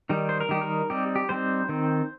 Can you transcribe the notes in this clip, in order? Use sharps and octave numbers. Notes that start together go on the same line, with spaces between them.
D#3 G3 D#4
C5
A#4
D#3 G3 D#4 G4
A#4
G3 C4 D#4 G4
G4
G3 C4 D#4 C5
D#3 C4 D#4